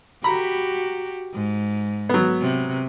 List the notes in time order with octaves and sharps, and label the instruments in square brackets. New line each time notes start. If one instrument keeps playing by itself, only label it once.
[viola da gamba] F#4 G4 [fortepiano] A#5 B5
[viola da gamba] G#2
[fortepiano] F#3 B3
[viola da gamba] C3